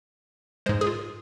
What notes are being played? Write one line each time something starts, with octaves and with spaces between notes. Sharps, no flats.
G#2 G#3 C5
G#4
F4